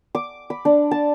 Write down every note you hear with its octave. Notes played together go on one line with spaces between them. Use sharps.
D6
B5
D4
A5